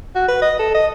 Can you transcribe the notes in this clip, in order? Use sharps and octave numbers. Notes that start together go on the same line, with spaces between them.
F#4
B4
D#5
A4
D#5